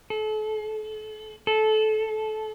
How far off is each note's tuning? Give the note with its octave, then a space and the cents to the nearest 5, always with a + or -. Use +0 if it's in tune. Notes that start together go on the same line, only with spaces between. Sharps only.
A4 -35
A4 -20